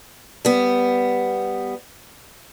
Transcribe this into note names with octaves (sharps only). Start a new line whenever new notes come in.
G3 B3